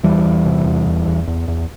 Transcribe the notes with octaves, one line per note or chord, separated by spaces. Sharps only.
E2 E3 G3
E2
C3
E2
E2
E2
E2
E2